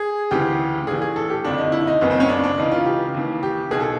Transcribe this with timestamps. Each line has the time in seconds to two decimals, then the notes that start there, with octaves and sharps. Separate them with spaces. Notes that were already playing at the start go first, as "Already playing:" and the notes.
Already playing: G#4
0.31 D2 C#3 E3 G4
0.87 A#1 A2 E3 G#4
1.02 G#4
1.16 A4
1.30 G4
1.44 F#1 F2 D3 D4
1.58 D#4
1.72 E4
1.87 D#4
2.01 F#1 F#2 C#3 B3
2.11 C4
2.20 C#4
2.29 D4
2.44 D4
2.58 C#2 C#3 E3 D#4
2.72 F4
2.86 G4
3.14 D#2 C#3 E3
3.43 G4
3.71 B1 B2 G#4
3.80 A4